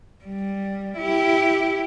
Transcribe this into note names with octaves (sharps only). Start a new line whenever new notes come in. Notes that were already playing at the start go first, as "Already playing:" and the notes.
G3
E4 G4